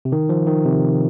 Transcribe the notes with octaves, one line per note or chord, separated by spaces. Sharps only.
C3
D#3
F3
D#3
C3